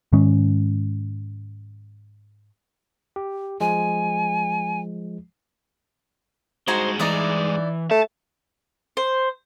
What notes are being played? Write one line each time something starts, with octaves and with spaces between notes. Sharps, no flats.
G#2 D#3 G#3 C#4
G4
F3 G#3 G#5
G2 G#3 D#4 F#4 C5 G#5
E3 D#4 D5 D#6
A3 A5
C5